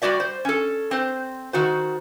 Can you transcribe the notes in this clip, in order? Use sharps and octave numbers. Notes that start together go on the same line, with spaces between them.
G3 A#3 F#4 D5 E5
C5
C#4 A4
C4 C5
D#3 F#4 C5